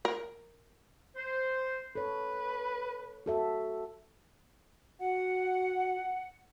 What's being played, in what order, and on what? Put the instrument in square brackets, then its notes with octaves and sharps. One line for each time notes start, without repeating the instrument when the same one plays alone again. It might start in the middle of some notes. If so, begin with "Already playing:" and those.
[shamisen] A#4
[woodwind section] C5
[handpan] A4 C#5 [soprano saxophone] B4
[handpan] F#4 A4 E5
[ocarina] F#4 [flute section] F#5